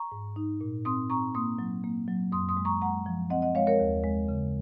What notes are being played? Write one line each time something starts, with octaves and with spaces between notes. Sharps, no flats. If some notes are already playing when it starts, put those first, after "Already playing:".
Already playing: A#5 C#6
G#2
D#4
A#2
C4 C6 D#6
C4 A#5 C#6
A#3 C6 D#6
F#3
A#3
F#3
F#2 C6 D#6
C6 D#6
G#3
A#5 C#6
G#3 F#5 A#5
F3
C4 D#5 F#5
D#5 F#5
G#3 C#5 F5
A#4 C#5
D#2
G#3
C#3